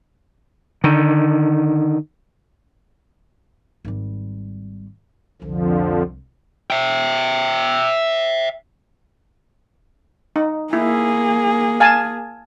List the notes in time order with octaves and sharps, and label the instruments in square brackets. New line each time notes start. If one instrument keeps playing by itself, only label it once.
[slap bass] D3 D#3
[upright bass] G#1 G3
[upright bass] C2 [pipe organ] F2 D3 F3
[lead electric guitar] E5 G5
[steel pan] D#4
[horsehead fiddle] A#3 G#4 [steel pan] E4
[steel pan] F5 G#5 A5